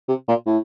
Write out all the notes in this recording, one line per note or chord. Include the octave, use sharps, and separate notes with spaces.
C3
A#2
A2